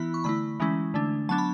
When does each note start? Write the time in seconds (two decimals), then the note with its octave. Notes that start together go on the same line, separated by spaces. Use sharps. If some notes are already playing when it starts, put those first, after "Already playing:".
Already playing: E3 B3 E4 B5
0.14 C#6
0.24 D3 A3 E4 B5
0.60 E3 G#3 C#4 E4
0.94 D3 A3 D4
1.29 F#3 B3 D4 A5
1.38 B5